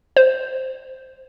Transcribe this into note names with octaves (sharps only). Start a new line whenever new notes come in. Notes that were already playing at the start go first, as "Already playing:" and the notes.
C5